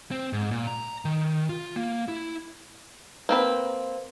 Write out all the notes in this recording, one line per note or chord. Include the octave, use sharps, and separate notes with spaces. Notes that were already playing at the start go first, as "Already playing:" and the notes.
C4
G#2
A#2
A#5
D#3
F4
A#3
E4
A#3 C4 B4